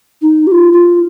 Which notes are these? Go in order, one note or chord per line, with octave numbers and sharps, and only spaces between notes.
D#4
G4
F4
F4